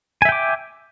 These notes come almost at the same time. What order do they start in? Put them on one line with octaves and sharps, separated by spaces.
G#5 E5 G5 D6